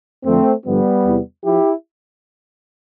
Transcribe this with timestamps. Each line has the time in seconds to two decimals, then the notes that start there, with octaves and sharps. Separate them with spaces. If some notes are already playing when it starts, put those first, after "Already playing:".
0.24 F2 D3 F3 A3 C4
0.65 G2 D3 F3 G3 B3
1.04 E2 C3 E3
1.44 F3 E4 G4